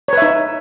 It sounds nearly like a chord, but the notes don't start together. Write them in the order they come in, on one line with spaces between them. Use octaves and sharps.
C#5 B4 E5 D#4